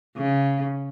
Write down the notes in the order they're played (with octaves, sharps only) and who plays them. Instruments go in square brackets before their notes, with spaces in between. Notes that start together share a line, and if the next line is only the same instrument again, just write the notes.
[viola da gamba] C#3